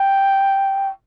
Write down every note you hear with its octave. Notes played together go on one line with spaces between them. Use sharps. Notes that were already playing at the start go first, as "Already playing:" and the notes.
Already playing: G5